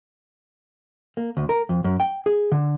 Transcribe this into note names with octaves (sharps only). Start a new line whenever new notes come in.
A#3
D2
A#4
F2
F#2
G5
G#4
D3